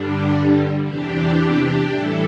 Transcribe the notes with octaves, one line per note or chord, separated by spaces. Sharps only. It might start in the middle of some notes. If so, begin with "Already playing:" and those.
Already playing: G2 D3 G3 D4
E2 C3 E3 D4 G4
A2 E3 G3 E4 A4